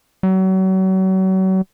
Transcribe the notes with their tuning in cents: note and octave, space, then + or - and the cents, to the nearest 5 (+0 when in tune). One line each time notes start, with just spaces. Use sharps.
F#3 +35